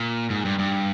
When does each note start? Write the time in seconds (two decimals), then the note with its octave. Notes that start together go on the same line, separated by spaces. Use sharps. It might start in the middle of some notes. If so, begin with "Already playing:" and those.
Already playing: A#2
0.30 G#2
0.45 G2
0.59 G2